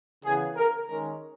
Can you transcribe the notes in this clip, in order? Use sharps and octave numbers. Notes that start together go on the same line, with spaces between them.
C#3 E3 B3 G#4
A#4
D#3 G#3 C#4 A#4